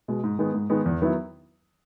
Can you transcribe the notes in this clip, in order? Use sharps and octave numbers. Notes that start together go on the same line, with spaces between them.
B2 G#3
G#2
D#3 G#3 B3
G#2
D#3 G#3 B3
E2
D#3 F#3 B3 E4